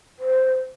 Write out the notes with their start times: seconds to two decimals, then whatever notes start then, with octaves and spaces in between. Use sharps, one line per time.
0.19 C5